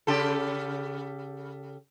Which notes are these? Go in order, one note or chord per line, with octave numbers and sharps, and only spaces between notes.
C#3 G4 A4